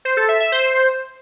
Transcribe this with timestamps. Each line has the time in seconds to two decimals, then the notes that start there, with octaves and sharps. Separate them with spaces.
0.05 C5
0.17 A4
0.29 E5
0.40 E5
0.52 C5